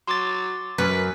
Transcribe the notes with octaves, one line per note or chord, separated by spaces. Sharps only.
F#3 C6 D6 A6
F#2 B4